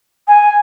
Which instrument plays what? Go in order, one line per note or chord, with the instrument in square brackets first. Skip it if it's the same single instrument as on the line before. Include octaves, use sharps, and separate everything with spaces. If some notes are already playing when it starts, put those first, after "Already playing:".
[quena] G#5